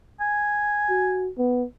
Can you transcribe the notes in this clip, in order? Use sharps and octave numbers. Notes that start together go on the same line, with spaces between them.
G#5
F#4
B3